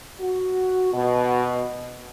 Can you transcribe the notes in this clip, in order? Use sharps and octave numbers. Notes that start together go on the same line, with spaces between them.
F#4
B2